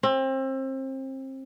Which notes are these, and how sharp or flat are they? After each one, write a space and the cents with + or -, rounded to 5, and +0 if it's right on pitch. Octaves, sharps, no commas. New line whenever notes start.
C4 +30